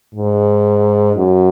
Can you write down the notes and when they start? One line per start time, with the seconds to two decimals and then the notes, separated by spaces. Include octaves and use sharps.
0.15 G#2
1.16 F#2